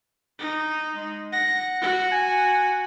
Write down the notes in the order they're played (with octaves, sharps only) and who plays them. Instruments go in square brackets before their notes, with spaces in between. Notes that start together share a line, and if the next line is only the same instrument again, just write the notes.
[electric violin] D#4
[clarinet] G#3
[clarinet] F#5 [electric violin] A#6
[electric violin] F#4
[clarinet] G#5